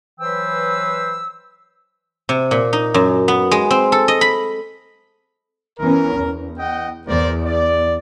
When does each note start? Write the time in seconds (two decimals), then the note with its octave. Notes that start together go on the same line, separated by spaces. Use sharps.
0.20 E3 F#3 B4 C5 G5 E6
2.29 C3
2.51 A#2
2.73 D#4
2.94 F#2
3.28 B3
3.51 G#3
3.71 C4
3.92 A4
4.08 D#5
4.21 B5
5.79 E3 B3 C#4 A#4
6.17 E2
6.59 D#5 F#5 G5
7.08 E2 A#4 C5 D5
7.45 D5